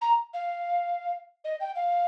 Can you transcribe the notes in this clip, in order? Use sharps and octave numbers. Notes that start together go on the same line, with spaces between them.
A#5
F5
D#5
G5
F5